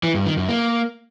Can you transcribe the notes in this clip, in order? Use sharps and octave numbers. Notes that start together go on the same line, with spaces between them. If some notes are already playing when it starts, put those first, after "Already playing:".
E3
G2
D#3
F#2
A#3